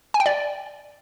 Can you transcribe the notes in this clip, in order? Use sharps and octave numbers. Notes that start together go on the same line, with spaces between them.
G#5
G5
D5